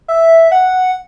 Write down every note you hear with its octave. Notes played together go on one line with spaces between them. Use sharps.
E5
F#5